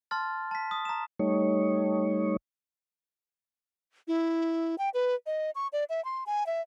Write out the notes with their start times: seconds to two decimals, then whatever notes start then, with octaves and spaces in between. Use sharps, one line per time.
0.11 A5 C6 F6 A6
0.51 A5 B6
0.71 D#6
0.85 A#5 E7
1.19 G3 A3 D#4 C#5
4.08 E4
4.78 G5
4.94 B4
5.26 D#5
5.55 C#6
5.73 D5
5.90 E5
6.05 C6
6.26 G#5
6.47 E5